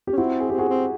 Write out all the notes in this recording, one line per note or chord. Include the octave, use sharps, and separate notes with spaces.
G4
C#4
C4 E4 F#4
G#4
C4 G4
F#4 G#4
C4